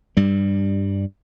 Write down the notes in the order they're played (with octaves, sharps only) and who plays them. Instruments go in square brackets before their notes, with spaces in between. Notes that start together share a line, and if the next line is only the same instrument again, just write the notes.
[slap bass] G2 G3